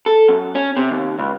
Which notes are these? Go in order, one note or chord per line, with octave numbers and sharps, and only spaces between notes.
A4
F#2
C#4
C3
D#2
C#2